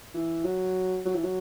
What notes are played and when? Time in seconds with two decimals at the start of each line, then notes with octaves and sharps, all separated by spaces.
0.15 E3
0.45 F#3
1.05 F#3
1.15 E3
1.24 F#3